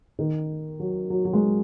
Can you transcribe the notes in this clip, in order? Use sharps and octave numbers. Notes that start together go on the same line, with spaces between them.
D#3
F#3
F#3
F#3
G#3